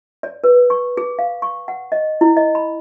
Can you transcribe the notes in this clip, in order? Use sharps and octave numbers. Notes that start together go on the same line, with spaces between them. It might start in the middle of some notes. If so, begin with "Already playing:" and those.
D5
B4
C#6
G#4
F5
C#6
F#5
D#5
E4
D#5
B5